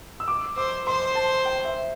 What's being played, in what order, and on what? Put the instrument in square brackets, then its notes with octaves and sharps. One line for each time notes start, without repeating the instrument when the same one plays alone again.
[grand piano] E6
D6
[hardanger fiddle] C5 [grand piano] D6
[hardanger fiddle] C5 [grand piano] C6
[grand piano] A5
G5
E5